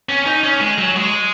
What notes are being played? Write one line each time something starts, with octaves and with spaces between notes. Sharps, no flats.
C#4
D#4
C#4
G#3
F#3
G#3